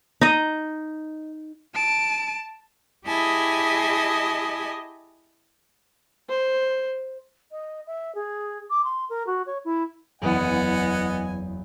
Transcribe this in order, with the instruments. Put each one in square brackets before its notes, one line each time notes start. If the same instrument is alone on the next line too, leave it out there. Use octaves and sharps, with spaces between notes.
[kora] D#4 D#5
[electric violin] A5 D7
[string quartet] E4 G4 G#4 D#5 G#5 A5
[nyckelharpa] C5
[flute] D#5
E5
G#4
D6
C6
A#4
F#4
C#5
E4
[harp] F#1 E2 D#6 [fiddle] B3 [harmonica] D#5 F#5 G#5